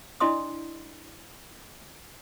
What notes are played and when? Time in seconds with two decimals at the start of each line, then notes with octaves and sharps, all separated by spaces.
0.20 D4 E4 D5 D#5 C6 D#6